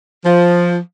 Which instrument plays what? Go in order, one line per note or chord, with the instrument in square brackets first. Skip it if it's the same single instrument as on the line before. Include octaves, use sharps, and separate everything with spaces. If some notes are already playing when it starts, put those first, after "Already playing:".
[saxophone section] F3